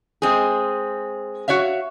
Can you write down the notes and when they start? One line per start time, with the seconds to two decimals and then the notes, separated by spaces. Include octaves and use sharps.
0.22 G#3 C4 G#4
1.48 F#4 C#5 E5 F5